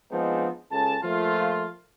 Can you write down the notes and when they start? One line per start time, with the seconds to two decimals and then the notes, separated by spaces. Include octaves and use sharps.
0.12 F3 G#3 B3 C4 D4 D#4
0.72 C#2 C#3 A4 A5
1.03 F3 A3 A#3 F4